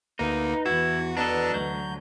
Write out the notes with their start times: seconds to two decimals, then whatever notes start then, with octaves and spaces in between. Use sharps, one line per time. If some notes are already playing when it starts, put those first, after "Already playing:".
0.19 D2 A#3 D#4 B4
0.66 E2 E3 E4 F#4
1.17 B2 B3 D4 A4 A5 A#5
1.54 D2 D3 F#3 G6